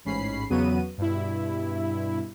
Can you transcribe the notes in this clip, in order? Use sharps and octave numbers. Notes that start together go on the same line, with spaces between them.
A1 G#2 C#4 B5 C7
E2 C#3 F#3 B3 F#4 D#7
G2 B2 E4